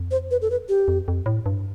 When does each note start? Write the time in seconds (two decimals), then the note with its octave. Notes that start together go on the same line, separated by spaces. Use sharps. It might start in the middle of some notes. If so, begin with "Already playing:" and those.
Already playing: F2
0.11 C5
0.31 B4
0.42 A4
0.51 B4
0.69 G4
0.88 F2
1.08 F2
1.26 A2
1.46 G2